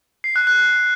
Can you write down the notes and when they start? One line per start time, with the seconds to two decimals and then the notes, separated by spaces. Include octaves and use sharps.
0.24 C7
0.36 F#6
0.47 F#6